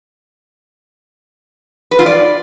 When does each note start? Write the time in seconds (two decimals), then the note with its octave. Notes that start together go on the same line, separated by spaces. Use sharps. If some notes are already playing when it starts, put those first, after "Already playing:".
1.91 B4
1.99 F4
2.06 D5